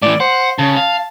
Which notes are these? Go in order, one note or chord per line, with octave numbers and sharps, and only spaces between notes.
A2 E3 D5
C5 F#5
C#3 A5
F5